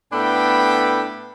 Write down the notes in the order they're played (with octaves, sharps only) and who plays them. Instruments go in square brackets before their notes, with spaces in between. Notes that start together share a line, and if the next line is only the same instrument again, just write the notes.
[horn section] A2 B3 D4 A4 G5 B5